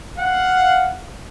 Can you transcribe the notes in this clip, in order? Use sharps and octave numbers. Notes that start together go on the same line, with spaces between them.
F5 F#5